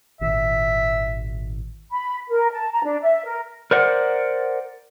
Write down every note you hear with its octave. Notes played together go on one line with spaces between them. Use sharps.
G#1 A#2 D#3 E5
B5
A#4
A5
A#5
D4
E5
A#4
A#4 C5 D5 F#5